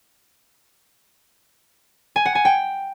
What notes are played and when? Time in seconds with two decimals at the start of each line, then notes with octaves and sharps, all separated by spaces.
2.16 G#5
2.25 F#5
2.35 G#5
2.45 G5